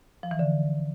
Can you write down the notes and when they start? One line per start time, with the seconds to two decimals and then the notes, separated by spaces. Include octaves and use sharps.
0.23 F3
0.31 E3
0.39 D3